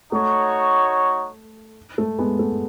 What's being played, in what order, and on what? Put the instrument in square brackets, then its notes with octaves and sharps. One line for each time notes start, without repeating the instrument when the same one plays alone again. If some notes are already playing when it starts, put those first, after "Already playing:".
[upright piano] A3 [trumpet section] D#4 F#4 C#5
[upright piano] A3
G#3 B3
A3